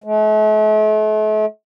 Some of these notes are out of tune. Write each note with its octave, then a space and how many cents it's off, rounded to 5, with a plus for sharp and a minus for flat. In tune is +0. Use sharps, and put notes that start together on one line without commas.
A3 -40